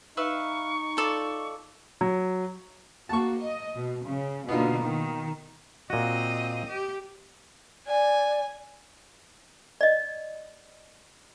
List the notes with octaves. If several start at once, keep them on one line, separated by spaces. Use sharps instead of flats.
D#4 B4 E5 F5 C#6
F4 A4 D5
F#3
A#3 F#4 A5 C#6
D#5
B2
C#3
B2 D3 A#3 B3 D#4 F4
D#3
A#2 C4 F#4 D#5
G4
D5 G#5
D5 D#5